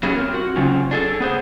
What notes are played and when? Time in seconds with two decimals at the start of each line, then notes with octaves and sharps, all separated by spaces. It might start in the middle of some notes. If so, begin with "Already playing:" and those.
0.03 F#3 B3 C#4 G#4
0.16 C4 A#4
0.34 F#4
0.56 C#3 F#3 C4 C#4 F4
0.91 D4 G#4 A4
1.20 B3 G#4 C5